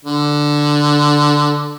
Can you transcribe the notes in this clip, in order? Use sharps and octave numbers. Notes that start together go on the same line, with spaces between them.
D3